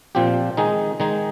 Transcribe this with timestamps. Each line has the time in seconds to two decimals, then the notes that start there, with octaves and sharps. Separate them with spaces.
0.15 A#2 F3 C4 G4
0.57 D#3 G#3 D#4 G#4
1.00 D#3 G#3 D#4 G#4